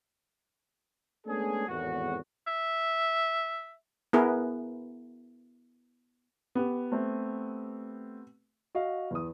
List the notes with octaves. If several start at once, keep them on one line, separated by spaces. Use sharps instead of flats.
G#3 A3 B3 C#4 D4 G#4
G#1 E2 A2 F#4
E5
B3 E4 G#4 A#4 B4
B3 G4
A3 C4
F#4 D#5 F5
E2 D#6